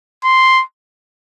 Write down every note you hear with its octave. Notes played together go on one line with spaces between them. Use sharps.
C6